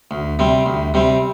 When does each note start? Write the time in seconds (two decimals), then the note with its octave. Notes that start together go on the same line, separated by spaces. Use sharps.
0.11 D2
0.39 C3 G3 C4
0.66 D2
0.94 C3 G3 C4